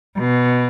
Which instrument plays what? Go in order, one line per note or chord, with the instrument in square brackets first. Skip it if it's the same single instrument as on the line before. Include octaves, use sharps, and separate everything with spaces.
[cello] B2